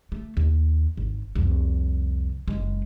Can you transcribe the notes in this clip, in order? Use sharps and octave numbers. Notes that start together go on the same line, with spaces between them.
A3
D#2
G#1
C2 F2
F#1 G#3